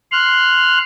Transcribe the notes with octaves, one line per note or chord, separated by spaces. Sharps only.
C6 F6 F#6